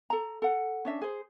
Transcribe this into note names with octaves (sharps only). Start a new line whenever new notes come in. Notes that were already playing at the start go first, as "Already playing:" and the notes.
A4 A#5
A4 F#5
C#4 D4 E5
G#4 C5